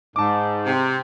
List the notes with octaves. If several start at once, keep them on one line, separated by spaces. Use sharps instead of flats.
G#2 A5 D6
C3